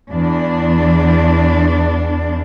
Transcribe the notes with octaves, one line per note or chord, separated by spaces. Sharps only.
E2 D4